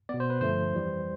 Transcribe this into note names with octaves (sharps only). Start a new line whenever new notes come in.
B2 B3 D5
C5
B4
G2 D3 F3 A3 C5
F2 E3 G3